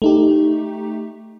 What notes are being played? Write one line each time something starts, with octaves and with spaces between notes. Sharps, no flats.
A3 D#4 G4